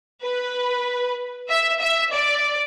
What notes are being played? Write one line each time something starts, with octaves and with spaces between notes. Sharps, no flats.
B4
E5
E5
D5